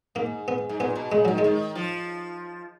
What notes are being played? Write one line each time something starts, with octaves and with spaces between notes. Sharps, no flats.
G#2 A#3
B3
G#2
A#2 B3
B2
C#3 G#3
D#3 F#3
G#3
D#3
F3